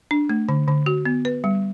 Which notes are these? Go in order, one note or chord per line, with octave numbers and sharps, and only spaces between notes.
D4
A3
D3
D3
F#4
B3
B4
G3